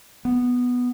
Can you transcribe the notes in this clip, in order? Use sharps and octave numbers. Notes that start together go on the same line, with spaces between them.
B3